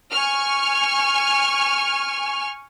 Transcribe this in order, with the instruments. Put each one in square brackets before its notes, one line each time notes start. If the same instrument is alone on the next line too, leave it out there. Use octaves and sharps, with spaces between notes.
[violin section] G#5 C#6 F6